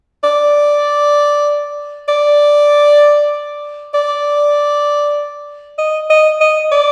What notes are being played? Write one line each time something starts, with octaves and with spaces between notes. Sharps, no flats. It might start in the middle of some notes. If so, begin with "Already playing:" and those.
D5
D5
D5
D#5
D#5
D#5
D5